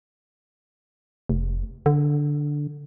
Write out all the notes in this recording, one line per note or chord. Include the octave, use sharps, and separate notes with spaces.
F1
D3